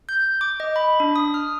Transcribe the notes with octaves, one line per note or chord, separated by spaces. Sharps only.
G6
D6
D#5
B5
D4
D#6
F6